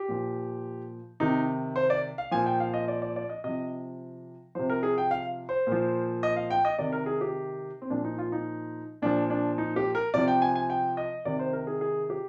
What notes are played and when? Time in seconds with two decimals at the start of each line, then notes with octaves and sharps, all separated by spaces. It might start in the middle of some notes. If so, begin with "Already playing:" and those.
Already playing: G4
0.09 A#2 F3
1.20 C3 D#3 D#4
1.76 C5
1.90 D5
2.18 F5
2.31 A#2 F3 G#5
2.46 G5
2.60 F5
2.74 D#5
2.88 D5
3.02 D5
3.16 D5
3.29 D#5
3.44 C3 F3 D#5
4.55 C3 F3 C5
4.70 A#4
4.83 G#4
4.98 G5
5.11 F5
5.49 C5
5.67 A#2 F3
6.23 D#5
6.36 F5
6.50 G5
6.65 D#5
6.78 C3 D#3 D5
6.93 A#4
7.06 G#4
7.21 G4
7.82 C4
7.90 A#2 F3 D4
8.05 D#4
8.19 F4
8.32 D#4
9.02 A#2 F3 D4
9.30 D4
9.58 D#4
9.76 G4
9.95 A#4
10.14 C3 F3 D5
10.27 G5
10.42 G#5
10.55 G#5
10.70 G5
10.97 D#5
11.25 C3 D#3 D5
11.40 C5
11.53 A#4
11.67 G#4
11.81 G#4
12.10 G4